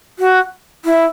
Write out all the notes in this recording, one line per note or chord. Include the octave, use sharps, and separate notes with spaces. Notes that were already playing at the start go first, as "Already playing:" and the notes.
F#4
E4